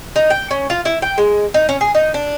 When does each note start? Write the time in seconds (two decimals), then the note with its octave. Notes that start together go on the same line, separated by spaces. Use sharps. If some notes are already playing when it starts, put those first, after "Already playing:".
0.16 D#4
0.30 G5
0.51 C#4
0.70 F4
0.85 E4
1.02 G5
1.18 G#3
1.54 D#4
1.69 C#4
1.81 G#4
1.95 D#4
2.14 D4